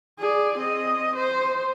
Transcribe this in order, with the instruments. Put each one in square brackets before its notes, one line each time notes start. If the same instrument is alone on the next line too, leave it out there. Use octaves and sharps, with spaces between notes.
[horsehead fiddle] G#4 D5
C4 D#5
C5